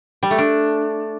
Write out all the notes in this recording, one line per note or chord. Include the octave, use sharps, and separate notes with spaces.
G3
A3
D4